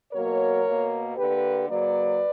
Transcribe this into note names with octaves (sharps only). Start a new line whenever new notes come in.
B2 F#3 A#3 A#4 C#5
B2 A#3
D3 A#3 G4 B4
C#3 F#3 A#3 B4 D5